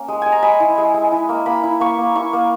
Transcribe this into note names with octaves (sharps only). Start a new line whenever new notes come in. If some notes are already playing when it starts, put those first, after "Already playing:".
Already playing: A#3 C#4
G#3
G#3 G#5
A#5
G#3 B5
E4
G#3
G#3
E4
A#3
A#3 B5
E4
A#3 C#6
A#3
E4 C#6
A#3